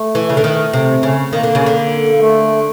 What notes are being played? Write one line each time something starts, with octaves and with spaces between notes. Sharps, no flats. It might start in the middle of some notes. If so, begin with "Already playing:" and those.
Already playing: A3
E3
C#3
D3
D#3
C3
C#3
D#3 A#3
D3
C#3
D3
A#3
A3